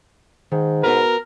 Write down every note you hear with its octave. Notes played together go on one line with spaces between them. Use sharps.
G#2 D#3
B3 F#4 A#4 B4